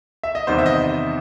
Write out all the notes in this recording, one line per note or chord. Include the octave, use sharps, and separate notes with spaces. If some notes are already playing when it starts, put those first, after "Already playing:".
E5
D#5
E2 C3 D#3 G3 B3 C5
E5
D#5
D#5